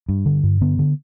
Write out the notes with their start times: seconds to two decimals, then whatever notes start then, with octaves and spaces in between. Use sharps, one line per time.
0.09 G2
0.26 D3
0.43 G2
0.61 D3 B3
0.79 D3